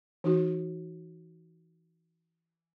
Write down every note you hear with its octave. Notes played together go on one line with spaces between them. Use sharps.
E3 D#4 F#4